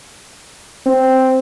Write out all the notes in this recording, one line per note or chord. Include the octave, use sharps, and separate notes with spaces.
C4